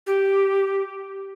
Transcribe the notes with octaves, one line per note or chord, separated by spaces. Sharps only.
G4